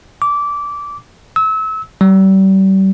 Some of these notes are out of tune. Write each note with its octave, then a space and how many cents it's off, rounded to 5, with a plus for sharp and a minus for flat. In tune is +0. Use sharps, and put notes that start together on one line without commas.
D6 -15
E6 -30
G3 -35